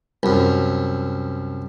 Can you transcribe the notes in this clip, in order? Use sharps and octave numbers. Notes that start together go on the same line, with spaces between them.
C2 F#2